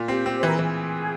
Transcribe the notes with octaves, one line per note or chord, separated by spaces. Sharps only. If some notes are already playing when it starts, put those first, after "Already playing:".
Already playing: A#2
C4 G4
C4
G4
C5
E3 A#4
G#4
E3